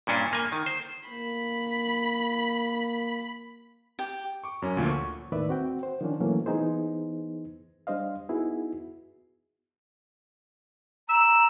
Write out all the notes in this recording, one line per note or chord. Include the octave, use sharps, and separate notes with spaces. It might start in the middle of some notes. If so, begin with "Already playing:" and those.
G2 A#2 C#4 D4
A#3 G#5
D#3
C5
A#3 B5
G4
C#6 D6
F#2 C#4
D2 A#2 F3
C#6
D#2 A2 D#3 B4 D5 E5
C4 F#4 F#5 G5
C5
D#3 F3 C#4 D4
A#2 E3 F#3 A3 A#3 C#4
E3 B3 D#4 G#4 C5
G3 D4 C5 D#5 F5
B3 D#4 E4 F#4 G#4
A#5 E6